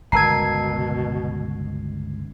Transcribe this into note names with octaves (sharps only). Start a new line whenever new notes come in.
G1 C#2 B2 A#4 A5 A#5 G#6 C7